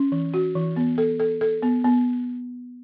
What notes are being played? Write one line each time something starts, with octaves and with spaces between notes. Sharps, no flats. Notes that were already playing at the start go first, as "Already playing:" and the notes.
Already playing: C#4
E3
F#4
E3
B3
A4
A4
A4
B3
B3